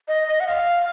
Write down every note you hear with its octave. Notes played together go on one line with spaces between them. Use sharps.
D#5
D#5
F#5
F5